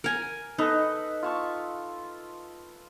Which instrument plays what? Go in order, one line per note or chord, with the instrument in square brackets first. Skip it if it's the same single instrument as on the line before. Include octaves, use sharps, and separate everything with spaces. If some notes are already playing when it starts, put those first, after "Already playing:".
[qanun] A#4 G#5
[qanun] D#4 [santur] A4 B4 D#5
[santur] F4 A5 C#6